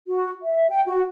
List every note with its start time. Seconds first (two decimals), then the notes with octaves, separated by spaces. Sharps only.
0.08 F#4
0.43 E5
0.70 G5
0.86 F#4